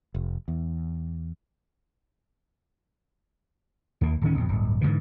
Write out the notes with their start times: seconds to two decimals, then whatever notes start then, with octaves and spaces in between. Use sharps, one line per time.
0.14 F1
0.48 E2
4.01 D#2 A#3
4.21 D1 D#3 C#4
4.37 A#1 F2
4.49 D1 G1
4.81 G#2 B2 D3 E3